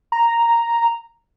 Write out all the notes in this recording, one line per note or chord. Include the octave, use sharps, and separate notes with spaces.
A#5